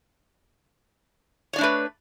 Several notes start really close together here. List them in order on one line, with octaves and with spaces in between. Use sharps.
C#5 D5 D4 A3 B4